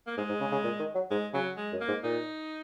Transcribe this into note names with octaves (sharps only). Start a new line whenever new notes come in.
A#3
G#2 G#3
G#2
C#3
C#3
A#2
D#3
F#3
G#2 G#3
C#3 F#3
G#3
F#2
A#3
G#2
A#2 D#4